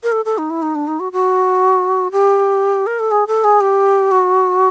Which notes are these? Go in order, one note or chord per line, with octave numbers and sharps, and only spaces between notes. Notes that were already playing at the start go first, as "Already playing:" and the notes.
A#4
A4
A4
D#4
E4
D#4
D4
D#4
F#4
F#4
G4
A#4
A4
G#4
A4
G#4
G4
F#4